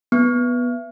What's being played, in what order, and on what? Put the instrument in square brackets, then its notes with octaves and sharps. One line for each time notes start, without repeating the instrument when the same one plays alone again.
[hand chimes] B3